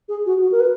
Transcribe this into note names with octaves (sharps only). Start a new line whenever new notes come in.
G#4
F#4
F#4
A#4
B4